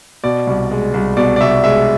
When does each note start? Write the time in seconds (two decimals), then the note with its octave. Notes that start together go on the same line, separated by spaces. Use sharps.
0.24 B2 D5
0.47 C2
0.71 G#3
0.94 C2
1.17 B2 D5
1.36 D5
1.41 C2 E5
1.64 G#3 E5